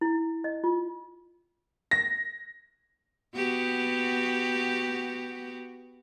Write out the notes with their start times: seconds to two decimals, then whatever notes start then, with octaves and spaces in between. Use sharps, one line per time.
0.01 E4
0.44 D#5
0.64 F4
1.91 A#6
3.35 B3 F#4 G4